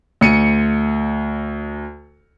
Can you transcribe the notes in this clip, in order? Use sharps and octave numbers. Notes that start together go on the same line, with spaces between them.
D2 C#7 D#7